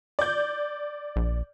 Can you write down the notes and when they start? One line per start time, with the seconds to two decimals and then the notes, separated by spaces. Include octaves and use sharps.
0.19 D5 G6
1.16 A#1